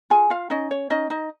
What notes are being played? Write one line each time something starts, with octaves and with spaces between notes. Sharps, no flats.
F4 G#4 G#5
F4 F5
C#4 D#4 D#5
C#5
C#4 D#4 D#5
D#4 D#5